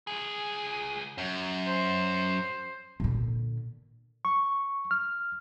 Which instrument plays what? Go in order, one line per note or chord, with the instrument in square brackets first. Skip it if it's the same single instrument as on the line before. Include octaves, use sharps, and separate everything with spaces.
[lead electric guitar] C#2 G#4
[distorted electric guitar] F#2
[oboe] C5
[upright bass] A#2 D3
[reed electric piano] C#6
F6